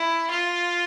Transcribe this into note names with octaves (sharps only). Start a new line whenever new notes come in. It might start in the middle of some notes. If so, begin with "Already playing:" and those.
Already playing: E4
F4